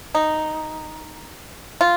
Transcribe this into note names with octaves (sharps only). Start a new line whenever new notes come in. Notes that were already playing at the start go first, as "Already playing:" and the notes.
D#4
F4